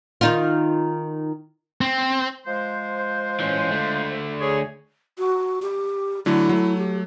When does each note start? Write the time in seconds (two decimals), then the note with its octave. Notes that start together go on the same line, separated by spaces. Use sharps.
0.21 D#3 D#4 F4
1.81 C4
2.45 F3 G#3 C5
3.40 E3 C#4
3.71 D3 A3
4.40 G#4 C#5
5.18 F#4
5.62 G4
6.26 D3 F#3 A3 E4
6.49 F#3 A3
6.78 G4